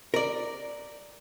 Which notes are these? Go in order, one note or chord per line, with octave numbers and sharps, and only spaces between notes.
A#4 D5